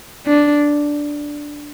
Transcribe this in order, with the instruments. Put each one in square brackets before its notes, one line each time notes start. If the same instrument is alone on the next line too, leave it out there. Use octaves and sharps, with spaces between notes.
[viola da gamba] D4